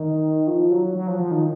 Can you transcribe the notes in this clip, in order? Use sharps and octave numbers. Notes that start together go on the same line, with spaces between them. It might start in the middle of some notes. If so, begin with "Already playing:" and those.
Already playing: D#3
F3
F#3
F#3
F3
F3
D#3